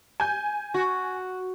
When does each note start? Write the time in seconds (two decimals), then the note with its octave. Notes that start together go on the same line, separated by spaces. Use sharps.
0.20 G#5 G6
0.74 F#4